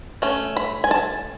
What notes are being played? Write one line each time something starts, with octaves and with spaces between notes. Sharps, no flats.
A3 C#4
B5
G#5
A5